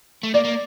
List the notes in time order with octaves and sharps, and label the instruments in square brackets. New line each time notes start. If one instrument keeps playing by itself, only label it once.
[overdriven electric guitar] A3
[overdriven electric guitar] A#3 [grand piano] D5
[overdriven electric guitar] A#3